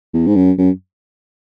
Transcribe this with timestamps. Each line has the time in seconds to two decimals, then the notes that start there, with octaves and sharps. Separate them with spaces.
0.14 E2
0.27 G#2
0.36 F#2
0.58 F#2